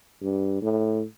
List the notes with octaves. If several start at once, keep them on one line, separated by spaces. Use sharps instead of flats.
G2
A2